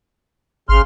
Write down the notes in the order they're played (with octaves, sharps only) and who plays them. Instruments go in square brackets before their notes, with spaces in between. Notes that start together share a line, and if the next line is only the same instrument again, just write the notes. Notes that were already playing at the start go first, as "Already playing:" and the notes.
[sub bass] G#1 [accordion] C#3 C6 F6